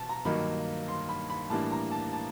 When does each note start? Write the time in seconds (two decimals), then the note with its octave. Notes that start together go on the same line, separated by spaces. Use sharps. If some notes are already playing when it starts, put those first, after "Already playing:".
Already playing: B2 A5
0.09 A#5
0.25 G2 D#3 F#3 A#3 D#4 B5
0.88 C6
1.09 B5
1.30 B5
1.50 A2 E3 G3 A#3 D4 A5
1.72 A#5
1.91 A5
2.13 A5